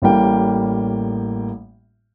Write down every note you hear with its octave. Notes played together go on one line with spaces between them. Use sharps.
A1 A2 G3 A#3 G5